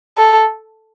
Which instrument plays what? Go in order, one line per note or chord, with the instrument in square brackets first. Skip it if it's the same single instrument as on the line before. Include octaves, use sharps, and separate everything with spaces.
[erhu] A4